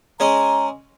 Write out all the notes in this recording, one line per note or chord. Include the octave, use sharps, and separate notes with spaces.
G#3 C#4 D#5 A#5